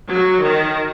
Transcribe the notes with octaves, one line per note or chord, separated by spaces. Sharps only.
F#3
D#3